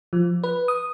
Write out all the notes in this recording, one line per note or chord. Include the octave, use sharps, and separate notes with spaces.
F3
B4
D#6